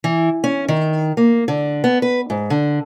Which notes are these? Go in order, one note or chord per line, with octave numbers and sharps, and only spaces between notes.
E3
C#4
D#3
A#3
D3
B3
B4
G#2
D3